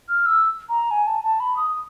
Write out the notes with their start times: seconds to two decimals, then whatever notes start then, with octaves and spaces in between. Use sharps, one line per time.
0.09 F6
0.26 E6
0.69 A#5
0.91 G#5
1.07 A5
1.24 A5
1.40 B5
1.56 D#6